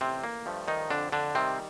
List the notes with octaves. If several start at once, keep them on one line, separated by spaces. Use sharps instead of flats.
A1 C3 C4
A#3
G2 F3 A3
D#3 D#4
F2 D3 D4
D3 D4
C3 D#3 G3 C4